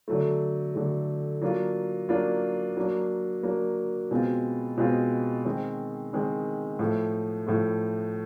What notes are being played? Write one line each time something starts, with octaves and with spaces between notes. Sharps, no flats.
D3 F#3 A3
D3 F#3 A3
F#3 A#3 D4 F4
F#3 A#3 D4 F4
F#3 A#3 D4
F#3 A#3 D4
B2 G#3 C4 F4
B2 G#3 C4 F4
D#3 G#3 C4
D#3 G#3 C4
A2 F3 A3
A2 F3 A3